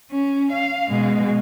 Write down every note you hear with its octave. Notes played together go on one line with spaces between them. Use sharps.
C#4
F5
B2 G#3